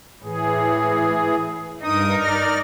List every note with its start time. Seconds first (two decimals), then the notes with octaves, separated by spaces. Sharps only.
0.24 A2 E3 G#4
1.83 G2 D#4 A#4 D#6
2.19 D5 F6